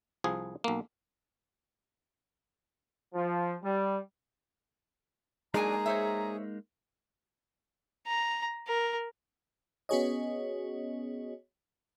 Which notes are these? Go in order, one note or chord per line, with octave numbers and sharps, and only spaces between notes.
C2 F3 G#4
B1 A#3
F3
G3
F#3 G#3 A#3 D4 D#4 G#4 G#5 A#5
C5 C#5 E5
A#5
A#4
B3 C#4 F#4 G#4 C#5 D#5